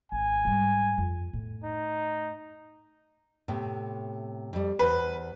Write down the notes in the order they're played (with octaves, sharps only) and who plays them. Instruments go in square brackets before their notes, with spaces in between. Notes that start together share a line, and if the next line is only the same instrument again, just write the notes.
[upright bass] G#1 [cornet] G#5
[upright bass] G#2 G3
F2
A2
[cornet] D#4
[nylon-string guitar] A2 C3 B3
F2 G3
[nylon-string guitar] E2 C5 [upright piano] B4